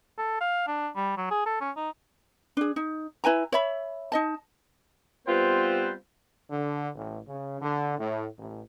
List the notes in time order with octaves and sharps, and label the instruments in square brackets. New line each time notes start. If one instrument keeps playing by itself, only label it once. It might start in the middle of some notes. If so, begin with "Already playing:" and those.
[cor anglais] A4
F5
D4
G3
F#3
G#4
A4
C#4
D#4
[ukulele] D4 G#4
D#4
E4 B4 G#5 A#5
C#5 E5 B5
D#4 D#5 A5
[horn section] G3 B3 C4 F4 B4 C5
[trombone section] D3
A1
C#3
D3
A2
A1